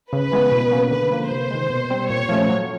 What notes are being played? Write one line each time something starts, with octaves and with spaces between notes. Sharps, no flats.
C#3 B4
E3 G#3 B3
B2
F#3 A#3 C#4
D3 B4
F3 A#3
C3 C5
D#3 G#3
B2
G3 C4
A#2 C#5
F3 A3 C#4
F#3